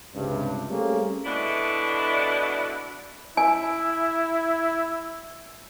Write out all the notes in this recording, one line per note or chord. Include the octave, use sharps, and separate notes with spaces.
C#2 G2 C3
G3 A3 A#3 C4 C#4 G#4
B2 D3 E3 D4 E4 B4
E4 G#5